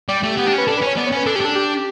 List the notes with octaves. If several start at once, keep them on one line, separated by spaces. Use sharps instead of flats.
G3 D5
A3 G4
B3
D4
C#4
B4
D4 A4
B4
C#4 C#5
B3 D5
C#5
C#4 B4
D4 A4
C#4 G4
D4 A4
G4